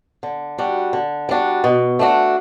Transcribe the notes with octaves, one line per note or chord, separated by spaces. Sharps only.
D3
G3 D4 F#4
D3
G3 D4 F#4
B2
A3 D4 F#4